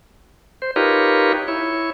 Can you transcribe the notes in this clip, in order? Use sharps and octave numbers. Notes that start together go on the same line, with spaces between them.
C5
D#4 F4 G4 A#4 B4 C#5
E4 C#5